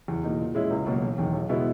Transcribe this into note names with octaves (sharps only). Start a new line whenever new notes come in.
E2
B2 A#3 D#4
A#2
G#3 C#4 E4
C#2
B2 F#3 A#3
E1
E2 D#3
B1
B2 G#3 B3 E4